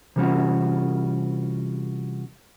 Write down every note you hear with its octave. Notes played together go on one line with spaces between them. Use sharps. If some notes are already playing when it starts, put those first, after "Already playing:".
C3 E3 G3 C#4 F4 F#4